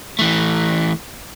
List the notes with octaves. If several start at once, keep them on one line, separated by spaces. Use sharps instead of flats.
E3 A3